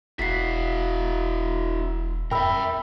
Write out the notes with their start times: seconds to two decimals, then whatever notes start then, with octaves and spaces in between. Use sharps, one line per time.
0.19 E1 E4 F#4 B6 C7
2.31 E2 A#4 E5 G5 B5 E6